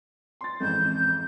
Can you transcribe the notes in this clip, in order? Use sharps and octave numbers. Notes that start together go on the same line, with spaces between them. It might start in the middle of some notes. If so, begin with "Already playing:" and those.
C6 A6
A1 F2 G#2 G6